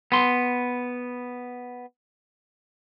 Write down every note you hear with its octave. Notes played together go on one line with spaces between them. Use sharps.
B3 C6